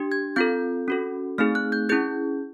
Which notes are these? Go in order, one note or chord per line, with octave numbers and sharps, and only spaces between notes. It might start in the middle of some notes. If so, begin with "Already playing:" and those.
Already playing: D4 G4
G#6
C4 F4 A4 G6
C#4 F#4 A4
A3 C4 D#4 G#4 F6
F#6
G6
C#4 E4 G#4 G6